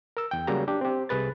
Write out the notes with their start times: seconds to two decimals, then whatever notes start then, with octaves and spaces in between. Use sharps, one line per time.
0.17 A#4 E6
0.31 E2 G5
0.47 C#3 F#3 G3 A#3 G#4 A#5
0.68 D4 G4
0.81 C4 G4
1.09 C2 C3 G#4 B4 A6